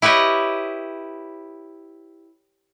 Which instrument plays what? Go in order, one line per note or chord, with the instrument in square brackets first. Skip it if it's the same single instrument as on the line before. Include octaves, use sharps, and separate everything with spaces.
[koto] E4 G4 B4 C#5 D#5